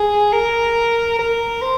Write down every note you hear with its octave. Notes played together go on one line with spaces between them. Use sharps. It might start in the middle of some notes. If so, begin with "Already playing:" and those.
Already playing: G#4
A#4
A#4
C5